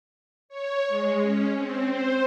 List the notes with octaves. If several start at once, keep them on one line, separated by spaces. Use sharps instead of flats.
C#5
G#3
C#4
C4
C5